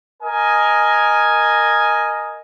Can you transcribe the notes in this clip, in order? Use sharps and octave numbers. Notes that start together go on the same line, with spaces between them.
A#4 D#5 G#5